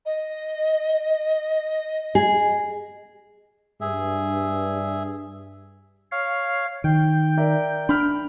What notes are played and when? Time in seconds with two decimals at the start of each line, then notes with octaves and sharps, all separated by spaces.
0.05 D#5
2.15 G#4
3.81 G2 G#4 E5
6.12 C#5 F5
6.84 D#3 G5
7.37 A#4 D5 E5
7.89 D4 B5 F6